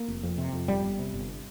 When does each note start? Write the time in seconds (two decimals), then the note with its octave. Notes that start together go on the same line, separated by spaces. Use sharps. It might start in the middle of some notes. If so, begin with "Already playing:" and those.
Already playing: A#3
0.08 F1
0.23 F2
0.38 C3
0.53 F2
0.68 G1 G3
0.83 G1
0.99 C3
1.14 G1